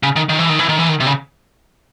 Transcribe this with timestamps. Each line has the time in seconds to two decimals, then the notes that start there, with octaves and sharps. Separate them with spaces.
0.03 C#3
0.16 D#3
0.29 D#3
0.39 E3
0.49 D#3
0.59 E3
0.69 D#3
0.79 E3
0.89 D#3
1.00 C3
1.07 C#3